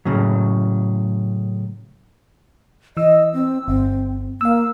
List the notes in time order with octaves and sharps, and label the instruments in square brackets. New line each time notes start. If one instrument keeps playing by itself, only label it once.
[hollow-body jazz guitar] A2 C#3 F#3
[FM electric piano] E3 E6 [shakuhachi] D#5
[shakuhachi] C4
[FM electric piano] G1 [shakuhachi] C4
[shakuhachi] A#3 [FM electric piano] F5 E6